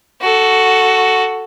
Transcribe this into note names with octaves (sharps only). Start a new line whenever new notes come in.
F#4 A4